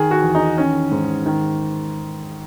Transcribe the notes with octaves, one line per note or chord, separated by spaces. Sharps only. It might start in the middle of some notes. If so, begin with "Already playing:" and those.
Already playing: D#3 G#4
F#4
E2
D#4
D#3 C#4
G#2
D#3